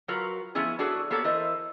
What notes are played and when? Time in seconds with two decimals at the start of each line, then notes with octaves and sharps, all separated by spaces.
0.08 F#3 F4 F#4 A#4 B4
0.55 F3 A3 B3 C#4 E4 G#4
0.79 D4 F#4 G#4 A4 B4 C#5
1.10 A#3 B3 G4 A4 C#5 F#5
1.24 E3 E4 A4 A#4 C5 D#5